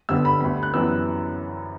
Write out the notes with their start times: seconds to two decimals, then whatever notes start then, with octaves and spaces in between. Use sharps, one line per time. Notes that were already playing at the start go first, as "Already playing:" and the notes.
0.09 G1 G2 D3 G3 B3 E6
0.25 B5
0.41 D2 D3 G3 B3 B5
0.63 F#6
0.73 F#2 E3 G3 B3 E6